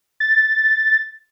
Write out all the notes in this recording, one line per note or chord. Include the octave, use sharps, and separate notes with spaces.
A6